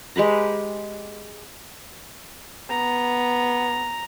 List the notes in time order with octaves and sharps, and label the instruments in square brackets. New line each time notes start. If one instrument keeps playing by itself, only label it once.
[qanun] G#3 G4 B4 A#5
[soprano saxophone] B3 [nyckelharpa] A#5